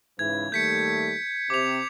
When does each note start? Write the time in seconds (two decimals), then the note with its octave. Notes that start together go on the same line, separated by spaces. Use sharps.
0.19 G#2 C#3 E3 G#6
0.52 D#2 G3 A3 G6 B6 C#7
1.50 C3 D6 F7